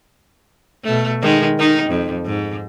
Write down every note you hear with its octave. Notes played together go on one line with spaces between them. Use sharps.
B2 A3
D#3 G#3
D#3 D#4
F2
G#2